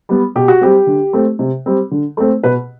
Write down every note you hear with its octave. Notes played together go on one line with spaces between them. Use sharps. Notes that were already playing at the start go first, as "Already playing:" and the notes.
G3 B3
B2 G4
F#4
G3 C4 G4
D3
A3 C4
C3
G3 C4
D3
A3 C4
B2 B4